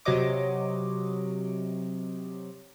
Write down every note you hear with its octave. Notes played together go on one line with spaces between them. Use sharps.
C3 F#3 C#5 D#5 D6